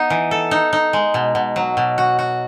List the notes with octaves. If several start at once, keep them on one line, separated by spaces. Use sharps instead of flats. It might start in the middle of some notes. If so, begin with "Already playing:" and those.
Already playing: B3 D#4
E3
A4
D#4
D#4
G#3
B2
B2
F#3
B2
F#4
F#4